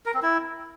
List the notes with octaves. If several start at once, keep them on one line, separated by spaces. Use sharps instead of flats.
A#4
C4
E4